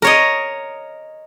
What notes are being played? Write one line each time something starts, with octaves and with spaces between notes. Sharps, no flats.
A#4 C#5 D#5